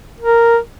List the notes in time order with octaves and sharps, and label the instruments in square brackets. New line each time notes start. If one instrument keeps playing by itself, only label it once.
[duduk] A#4